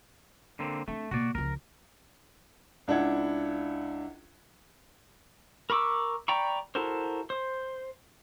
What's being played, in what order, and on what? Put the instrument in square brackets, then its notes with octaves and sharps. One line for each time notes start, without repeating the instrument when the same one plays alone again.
[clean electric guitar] D3 A#3 C4
[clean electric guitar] A3 [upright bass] C4 D4
[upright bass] B2 A#3 [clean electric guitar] F#4 D5
[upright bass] C#2 F3 [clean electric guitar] A#4
[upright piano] C#2 D4 E4 F#5 G#6
[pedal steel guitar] A#4 B5 C#6 D6 E6
D5 G5 A#5 B5 C#6
E4 F#4 A4 A#4 C5
C5